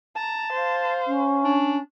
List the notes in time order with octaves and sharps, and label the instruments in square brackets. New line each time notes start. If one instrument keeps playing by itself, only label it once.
[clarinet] A5 [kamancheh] A#5
[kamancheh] C5 F5
[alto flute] C#4
[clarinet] D4